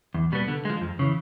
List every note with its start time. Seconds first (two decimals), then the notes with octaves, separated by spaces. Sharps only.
0.14 E2
0.32 B2 G3 B3
0.48 D3
0.65 F3 G#3
0.81 F2
0.99 C#3 E3